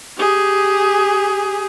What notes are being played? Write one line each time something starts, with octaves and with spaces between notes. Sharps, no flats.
G4 G#4